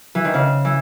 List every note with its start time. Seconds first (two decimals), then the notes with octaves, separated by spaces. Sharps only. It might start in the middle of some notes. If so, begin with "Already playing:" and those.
0.15 E3
0.24 D#3
0.34 C#3
0.65 E3